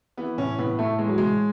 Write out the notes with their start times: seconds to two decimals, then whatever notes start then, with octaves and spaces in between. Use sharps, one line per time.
0.17 E3 B3
0.38 A2 C#4
0.58 A2 B3
0.79 A2 A3
0.99 E3 G#3
1.08 F#3
1.18 A2 G#3